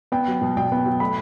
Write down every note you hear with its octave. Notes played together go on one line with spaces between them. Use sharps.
B3 G5
F#3
B2
B2 G5
B3
F#3
A3 B5